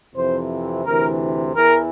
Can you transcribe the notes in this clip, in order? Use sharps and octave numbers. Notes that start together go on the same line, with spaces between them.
F2 C3 E3 C5
D2 C3 E3 A#4
E2 E3 A#4